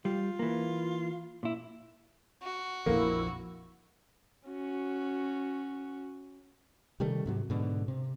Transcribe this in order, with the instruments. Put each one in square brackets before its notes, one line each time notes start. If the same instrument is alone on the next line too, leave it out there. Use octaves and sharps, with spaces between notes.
[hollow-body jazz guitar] G3 [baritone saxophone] F4
[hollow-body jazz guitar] E3 A#3
A#2 E4
[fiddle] F#4
[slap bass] A#1 F2 F3 [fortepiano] A#3 [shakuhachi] E4
[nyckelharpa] C#4 F#4
[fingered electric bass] C3 D#3 G3 A3
G#2 C3 F#3
G#2 B2 D3
C3